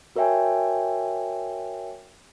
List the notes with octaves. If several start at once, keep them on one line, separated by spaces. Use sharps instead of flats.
F#4 A#4 C#5 E5 G5 G#5